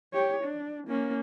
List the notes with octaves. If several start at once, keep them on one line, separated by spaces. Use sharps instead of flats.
G4 C#5
D4
A#3 C#4